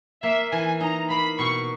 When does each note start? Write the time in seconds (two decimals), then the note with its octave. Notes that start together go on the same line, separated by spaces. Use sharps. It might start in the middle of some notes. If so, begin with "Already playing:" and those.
0.23 A#3 E5
0.52 E3 G#5
0.80 D#4 A#5
1.10 A#3 B5
1.39 B2 C#6